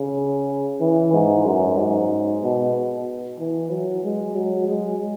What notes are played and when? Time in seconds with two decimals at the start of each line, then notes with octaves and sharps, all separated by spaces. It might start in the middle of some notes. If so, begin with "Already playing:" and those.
Already playing: C#3
0.80 E3
1.14 G#2
1.45 F#2
1.78 G#2
2.43 B2
3.40 E3
3.71 F#3
4.04 G#3
4.36 F#3
4.68 G#3